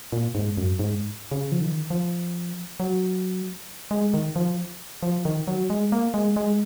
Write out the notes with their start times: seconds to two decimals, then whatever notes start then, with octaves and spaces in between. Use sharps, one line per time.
0.12 A#2
0.35 G#2
0.57 F#2
0.79 G#2
1.31 C#3
1.52 F3
1.61 D#3
1.90 F3
2.80 F#3
3.91 G#3
4.14 D#3
4.36 F3
5.03 F3
5.25 D#3
5.47 F#3
5.70 G#3
5.92 A#3
6.14 G#3
6.36 G#3